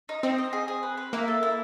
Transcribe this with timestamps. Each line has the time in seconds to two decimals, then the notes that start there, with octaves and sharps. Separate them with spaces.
0.09 D#4
0.23 C4 D#4
0.38 D#5
0.53 G#4
0.68 G#4
0.83 B4
0.97 B4
1.13 A#3 E4
1.28 A4
1.43 E4